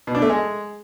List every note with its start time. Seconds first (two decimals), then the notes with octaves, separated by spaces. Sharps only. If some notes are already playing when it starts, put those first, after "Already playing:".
0.07 B2
0.15 D4
0.22 A3
0.29 G#3